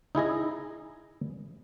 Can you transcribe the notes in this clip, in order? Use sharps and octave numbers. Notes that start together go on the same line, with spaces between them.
D#4 E4 G#4 D#5